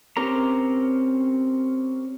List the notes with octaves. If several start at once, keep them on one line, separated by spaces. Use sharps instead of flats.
C4 C#4 G4 A#4 A#5